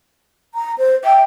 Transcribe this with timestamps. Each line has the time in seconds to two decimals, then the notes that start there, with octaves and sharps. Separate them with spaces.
0.55 A#5
0.78 C5
1.04 E5 G5